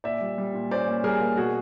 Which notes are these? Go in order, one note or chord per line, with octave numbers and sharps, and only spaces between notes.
A#2 D5 E5
G3
G3
A#2
C#4 C5 D5
A#3
G3 G#4 A#4
A#3
B2 F#4 G#4